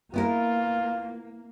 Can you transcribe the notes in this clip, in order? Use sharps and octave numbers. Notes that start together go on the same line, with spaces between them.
A#3 B3 E4 F4 A#4